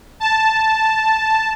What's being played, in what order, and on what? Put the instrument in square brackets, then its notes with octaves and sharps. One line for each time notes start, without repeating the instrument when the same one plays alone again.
[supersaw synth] A5